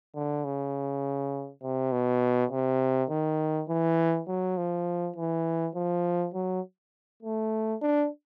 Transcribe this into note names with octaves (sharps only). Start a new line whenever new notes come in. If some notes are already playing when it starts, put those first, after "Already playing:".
D3
C#3
C3
B2
C3
D#3
E3
F#3
F3
E3
F3
F#3
A3
D4